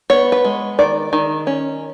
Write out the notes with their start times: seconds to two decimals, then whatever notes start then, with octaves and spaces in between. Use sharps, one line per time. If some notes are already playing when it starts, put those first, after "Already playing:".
0.10 B3 C#5
0.32 B4
0.45 G#3
0.79 D#3 D5
1.13 D#3
1.47 C#4